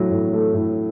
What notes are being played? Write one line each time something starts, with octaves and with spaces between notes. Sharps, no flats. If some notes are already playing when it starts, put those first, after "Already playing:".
Already playing: A2 F#3
A2
A3
A2